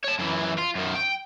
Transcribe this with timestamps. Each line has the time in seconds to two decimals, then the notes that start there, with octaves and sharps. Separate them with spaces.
0.04 C#5 A5
0.19 F#2 E3
0.58 F4
0.75 F#2 D#3
0.95 G5